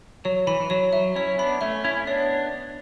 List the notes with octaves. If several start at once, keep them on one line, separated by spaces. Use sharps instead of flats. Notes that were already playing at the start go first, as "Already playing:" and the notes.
F#3 C#5
E3 B5
E3
F#3 C#5
F#3 E5
C#4 E4 C#5
B3 D4 B5
A3 C#4 E5
C#4 E4 E5
C#4
B3 D4 C#5